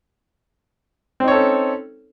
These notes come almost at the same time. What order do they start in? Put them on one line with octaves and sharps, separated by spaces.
C4 D#4 C#5 A4 C#4